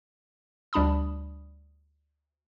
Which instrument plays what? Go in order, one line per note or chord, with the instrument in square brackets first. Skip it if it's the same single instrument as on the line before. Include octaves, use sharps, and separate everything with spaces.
[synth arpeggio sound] D2 G3 D4 A5 B5 D#6